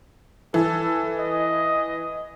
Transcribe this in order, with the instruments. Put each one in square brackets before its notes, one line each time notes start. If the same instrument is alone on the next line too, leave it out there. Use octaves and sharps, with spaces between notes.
[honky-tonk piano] E3 [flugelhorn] A4
[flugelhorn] D#5